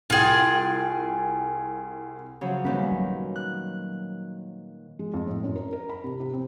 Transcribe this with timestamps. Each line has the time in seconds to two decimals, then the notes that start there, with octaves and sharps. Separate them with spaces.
0.10 C2 F4 G#4 G5
2.41 C#3 F3 F#3
2.65 A#2 D#3 G3 B3 C#4 B4
2.92 F#3 A#3
3.36 F#6
4.99 G#3
5.14 F2
5.27 A2
5.44 F#2
5.56 A#4
5.73 A#4
5.89 B5
6.04 C3
6.20 C3
6.33 C4